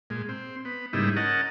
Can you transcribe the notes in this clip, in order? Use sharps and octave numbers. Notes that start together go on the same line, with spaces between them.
A#2 G#3
C4
B3
G#2 C#3 G3 A#3 D#4 E4
C#4 A#4 D#5 F#5 A5